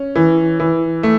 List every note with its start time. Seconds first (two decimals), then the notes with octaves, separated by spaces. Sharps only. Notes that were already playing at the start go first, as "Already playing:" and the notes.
Already playing: C#4
0.15 E3
0.60 E3
1.03 A3